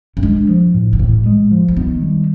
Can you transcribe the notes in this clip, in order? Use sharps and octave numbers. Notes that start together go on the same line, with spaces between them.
C#3
D3 G#3
F3
A2
D#3
A2 E3
G#3
F3
E3
D#3 B3
G3